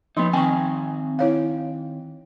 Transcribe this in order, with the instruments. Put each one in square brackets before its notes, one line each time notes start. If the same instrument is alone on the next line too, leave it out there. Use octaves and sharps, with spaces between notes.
[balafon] F3 C6 [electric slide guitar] B3 D#4
[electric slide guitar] D#3 C4 G#5 [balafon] G5 C#6
[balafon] E4 C#5 F5